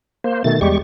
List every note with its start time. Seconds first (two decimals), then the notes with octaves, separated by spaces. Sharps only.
0.24 A#3 C5
0.44 B2 D#3 A3 A6
0.61 E2 G3 G#3 G4 C#6